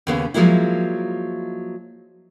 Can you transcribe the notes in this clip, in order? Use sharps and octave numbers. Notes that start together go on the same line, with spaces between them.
D#2 C#3 B3
F3 F#3 G#3 A#3 E4